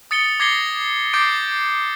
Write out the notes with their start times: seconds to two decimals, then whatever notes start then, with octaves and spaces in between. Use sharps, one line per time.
0.11 D#6 A6 C#7 D7 G7
0.40 D6 G#6 A#6 C7 C#7 G7
1.14 D6 G6 A6 C7 D7